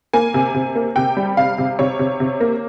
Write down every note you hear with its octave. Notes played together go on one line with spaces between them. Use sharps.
A#3 G#5
C3
C3
A#3
C3 G5
G3
C3 F5
C3
C3 C#5
C3
C3
A#3